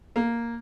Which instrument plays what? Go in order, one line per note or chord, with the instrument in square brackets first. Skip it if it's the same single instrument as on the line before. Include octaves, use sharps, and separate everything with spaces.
[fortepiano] A#3